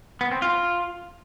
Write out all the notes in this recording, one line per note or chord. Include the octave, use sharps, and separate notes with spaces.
B3
C4
F4